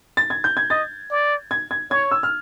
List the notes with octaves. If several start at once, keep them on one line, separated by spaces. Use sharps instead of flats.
A6
G#6
G6
G#6
D#5 A6
D5
G#6
G#6
C#5 G#6
E6
F6